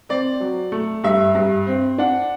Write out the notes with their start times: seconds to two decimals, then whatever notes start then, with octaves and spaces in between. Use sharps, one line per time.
0.09 C4 D5
0.40 F#3
0.72 A3
1.04 G2 E5
1.35 G2
1.67 C4
1.98 D4 F#5